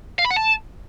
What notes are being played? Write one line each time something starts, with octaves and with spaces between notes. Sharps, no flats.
F5
B5
F#5
A5